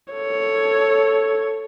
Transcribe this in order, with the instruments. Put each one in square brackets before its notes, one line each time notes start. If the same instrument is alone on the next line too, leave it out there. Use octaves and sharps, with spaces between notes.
[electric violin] A4 C#5